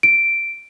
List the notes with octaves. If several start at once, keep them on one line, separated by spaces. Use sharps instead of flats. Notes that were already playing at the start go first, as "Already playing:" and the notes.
D7